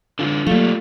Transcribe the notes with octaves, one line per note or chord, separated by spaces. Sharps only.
D3 F4
F#3 G3 A3 A#3 F4 A4 F5